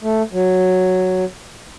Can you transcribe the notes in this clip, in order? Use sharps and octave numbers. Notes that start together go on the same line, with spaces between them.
A3
F#3